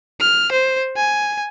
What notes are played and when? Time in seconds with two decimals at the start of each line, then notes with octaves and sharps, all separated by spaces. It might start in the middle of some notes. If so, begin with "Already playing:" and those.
0.21 F6
0.52 C5
0.97 G#5